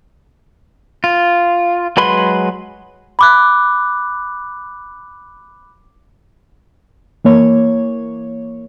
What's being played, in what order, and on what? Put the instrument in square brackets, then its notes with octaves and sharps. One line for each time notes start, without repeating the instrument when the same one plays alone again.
[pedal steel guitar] F4
F#3 G#3 B4 B5 C6
[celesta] B5 D6 F#6
[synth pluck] E3 A#3 C#5